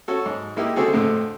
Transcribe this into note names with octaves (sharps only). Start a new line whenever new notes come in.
C#4 F#4 A4
G#2
G#3 A#3 D#4 E4 G4
D3 G#3 C4 F#4 G#4 A4
F2 A2 D3 C4